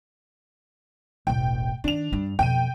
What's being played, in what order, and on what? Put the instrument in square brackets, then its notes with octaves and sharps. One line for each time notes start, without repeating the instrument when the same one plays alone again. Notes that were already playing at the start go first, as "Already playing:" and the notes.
[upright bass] E1 A1 [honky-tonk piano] G5
[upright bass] D#3 [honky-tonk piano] D4 F7
[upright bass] G2
[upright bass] F2 B2 [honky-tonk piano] G5 D#7